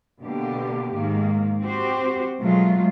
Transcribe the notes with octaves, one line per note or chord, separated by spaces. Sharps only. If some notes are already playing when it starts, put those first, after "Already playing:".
B2 D3 A#3 G4
G#2 D#3 A#3
C4 F#4 G4 C5
B2 F#3 G#3 A3 F4